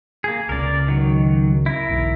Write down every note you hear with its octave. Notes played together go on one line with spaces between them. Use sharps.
A#3 G#4
C#2 C#3 A#4 D5
D#3 F#3
E4 A#4
B1 E2